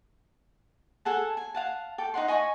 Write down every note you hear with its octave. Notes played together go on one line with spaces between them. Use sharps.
G#4 A4 F#5 A5
G#5
F5 F#5 A5
A4 G5 D6
D#4 C#5 F#5 C6
D#5 G#5 B5 C#6